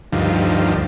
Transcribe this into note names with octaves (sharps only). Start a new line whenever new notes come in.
D2 G2 D#3 F3